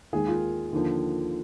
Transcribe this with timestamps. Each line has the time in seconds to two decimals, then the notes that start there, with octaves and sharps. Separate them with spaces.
0.13 D#2 D#3 G#3 G#4
0.28 F4
0.73 D#2 D3 F3